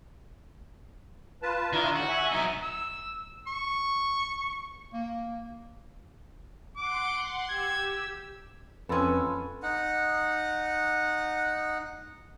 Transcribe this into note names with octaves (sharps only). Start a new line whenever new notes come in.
F4 B4 A5
D#3 D4 E4 F4
A2 F#4
E5 G#5
F#3 D#4
E6
C#6
A#3
F#5 C6 D6
G4 E6 G#6
F2 C#4 A4 B4 B5 C6 E6
D#4 F#5